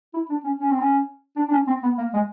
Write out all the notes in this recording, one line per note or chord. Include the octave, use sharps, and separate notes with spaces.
E4
D4
C#4
C#4
C4
C#4
D4
D4
C#4
C4
B3
A#3
G#3